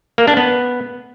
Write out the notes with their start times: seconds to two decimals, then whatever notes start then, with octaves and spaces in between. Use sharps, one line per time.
0.18 A#3
0.27 D4
0.37 B3